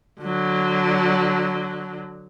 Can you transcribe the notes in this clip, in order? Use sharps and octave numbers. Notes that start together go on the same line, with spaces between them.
D3 F#3